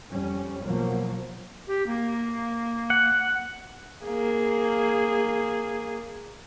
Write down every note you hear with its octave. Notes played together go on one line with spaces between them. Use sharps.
F2 G3 C#4
B2 F3 F#3 A#3
G4
A#3
F#5
A#3 G#4